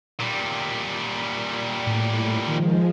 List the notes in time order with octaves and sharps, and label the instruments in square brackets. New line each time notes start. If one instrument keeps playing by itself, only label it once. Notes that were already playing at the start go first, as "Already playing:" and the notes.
[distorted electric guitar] A#2 G3
[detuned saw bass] A2
[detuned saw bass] D#3 [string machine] F3 G#3